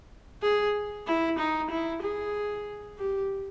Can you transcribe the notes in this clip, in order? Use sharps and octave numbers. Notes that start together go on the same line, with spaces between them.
G#4
E4
D#4
E4
G#4
G4